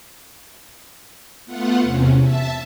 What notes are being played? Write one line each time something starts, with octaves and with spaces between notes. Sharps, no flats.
A3 B3 F4 F#5
E2 C3 C#4
E5 A5